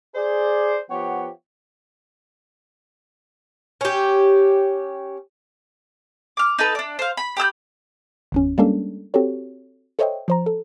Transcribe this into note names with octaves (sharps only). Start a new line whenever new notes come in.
G#4 C5 D5
F3 B3 G4 C#5 F#5 G5
C#4 G4
D6 F6
D#4 A4 B4
D4 D5
C5 F5
B5
G4 B5 E6 G6
G1 E2 C#4
G3 G#3 A#3 C#4 D4 A4
C4 F#4 G4 A4 C#5
A4 C5 C#5 D#5 E5 G5
F3 C5 A#5
A4